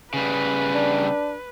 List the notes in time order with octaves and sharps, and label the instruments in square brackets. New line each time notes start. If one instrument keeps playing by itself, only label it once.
[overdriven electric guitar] C#3 G3 [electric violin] B4
[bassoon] D4